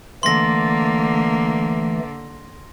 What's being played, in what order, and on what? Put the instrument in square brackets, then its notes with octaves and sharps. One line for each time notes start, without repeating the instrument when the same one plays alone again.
[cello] D3 A#3 [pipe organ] E3 A3 [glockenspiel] C6 A#6